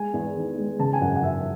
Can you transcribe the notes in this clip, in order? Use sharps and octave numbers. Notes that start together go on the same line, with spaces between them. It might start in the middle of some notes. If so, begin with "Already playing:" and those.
Already playing: G#3 G#5
E2
D#3
G#3
C#3 A5
G#5
F#2 F#5
F#5
F#2 E5